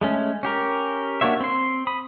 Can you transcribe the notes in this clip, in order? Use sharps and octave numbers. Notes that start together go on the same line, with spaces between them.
G#3 A3 C#4
C#4 G4 A#4
A#3 D4 F#4 C#5 E5
C4 C6
B5 D#6